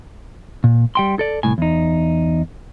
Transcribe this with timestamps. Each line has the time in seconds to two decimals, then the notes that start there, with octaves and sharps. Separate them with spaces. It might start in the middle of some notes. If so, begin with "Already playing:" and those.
0.64 A#2
0.95 G3 G5 C6
1.19 A4 D5
1.43 C2 A2 G#5
1.58 E2 D#4